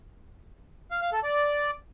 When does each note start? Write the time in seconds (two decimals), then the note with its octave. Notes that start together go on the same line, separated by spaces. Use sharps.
0.91 F5
1.02 F5
1.13 A4
1.23 D5